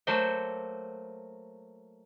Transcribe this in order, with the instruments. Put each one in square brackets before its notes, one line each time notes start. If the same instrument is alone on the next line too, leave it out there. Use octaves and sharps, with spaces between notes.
[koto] F#3 A3 A#3 F#4 C5 G5